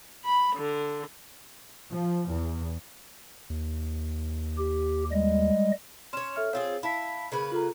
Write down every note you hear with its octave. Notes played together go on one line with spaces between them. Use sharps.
B5
D3
F3
E2
D#2
G4
G3 G#3 D#5
C#4 C#5 C6 E7
A4 E5 F6
C4 F4 G#4 C#5 F5
E4 F5 A5 B6
C#3 A#3 B4
F4 A4 A#5